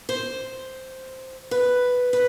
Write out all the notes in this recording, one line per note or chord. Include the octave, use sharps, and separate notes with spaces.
C5
B4
B4